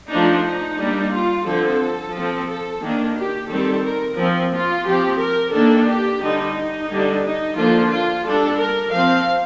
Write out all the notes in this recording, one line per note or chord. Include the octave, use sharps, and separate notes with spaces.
F3 A3 D4 D#4
D#4
G3 A#3 D4
F4
D3 F3 C4 A4
F3 C4
A4
D#3 A#3 D4
G4
D#3 G3 C4 A4
A#4
F3 C4
F4
F3 C4 G4
A#4
D#3 A#3 D4 A4
G4
D3 G3 D4 D#4
D#4
D3 G3 D4
D#4
D3 F3 A#3 D4 F4
F4
G3 D4 A4
A#4
F3 C4 F5